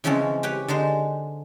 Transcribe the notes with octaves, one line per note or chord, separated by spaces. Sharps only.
C#3 E3 F3 G#3 C4 C#4
G4 B4 C#5 G5
D3 G#3 D#4 C5